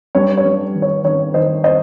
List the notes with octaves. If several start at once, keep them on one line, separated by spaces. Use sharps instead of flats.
G2 C#5
C#5
G2
D#3
C#5
D#3 C#5
D#3 C5 D#5
C5 D#5